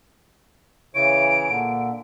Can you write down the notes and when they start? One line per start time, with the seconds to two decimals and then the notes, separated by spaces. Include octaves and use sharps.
0.95 C#3 E3 C#5 D7
1.49 A#2 D3